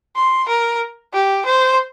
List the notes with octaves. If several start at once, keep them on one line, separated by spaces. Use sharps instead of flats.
C6
A#4
G4
C5